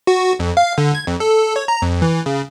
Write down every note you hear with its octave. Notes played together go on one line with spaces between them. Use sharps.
F#4
F2
F5
D3
G#6
F2
A4
C#5
A#5
F2
E3
C#3